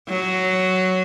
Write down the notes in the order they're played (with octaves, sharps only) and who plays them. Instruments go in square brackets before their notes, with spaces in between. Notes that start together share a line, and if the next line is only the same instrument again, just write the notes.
[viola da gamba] F#3